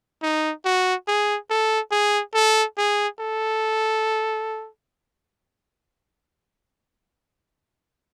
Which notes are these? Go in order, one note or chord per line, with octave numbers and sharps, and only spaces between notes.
D#4
F#4
G#4
A4
G#4
A4
G#4
A4